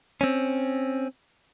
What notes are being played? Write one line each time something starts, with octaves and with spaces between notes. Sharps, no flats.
C4 C#4